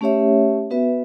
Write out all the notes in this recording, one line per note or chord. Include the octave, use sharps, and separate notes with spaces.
A3 C#4 G4 C#5 E5
B3 F#4 B4 E5